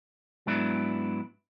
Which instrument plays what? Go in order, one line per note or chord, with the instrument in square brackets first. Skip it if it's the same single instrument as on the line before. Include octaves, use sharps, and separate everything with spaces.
[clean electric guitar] G#2 F#3 B3 D4 E4